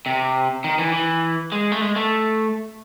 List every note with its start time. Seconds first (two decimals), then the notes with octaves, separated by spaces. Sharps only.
0.06 C3
0.64 D#3
0.79 E3
0.93 E3
1.52 G#3
1.72 A3
1.81 G#3
1.96 A3